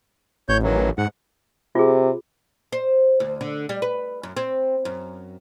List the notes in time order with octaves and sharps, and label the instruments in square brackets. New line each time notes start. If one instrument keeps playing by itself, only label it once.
[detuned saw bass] A1 [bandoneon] C#5 G6
[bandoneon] D#3 E3 F#3
[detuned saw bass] G#2 [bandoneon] F#5
[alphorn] C3 [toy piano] F4 G#4
[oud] C5
D2
D3
G3
B4
F#2
C4
F#2